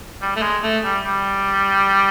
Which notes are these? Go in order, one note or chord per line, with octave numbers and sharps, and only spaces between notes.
G3
A3
G#3
A3
G3
G3